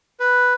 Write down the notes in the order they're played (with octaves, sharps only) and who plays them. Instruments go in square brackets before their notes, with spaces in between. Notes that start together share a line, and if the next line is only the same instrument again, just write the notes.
[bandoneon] B4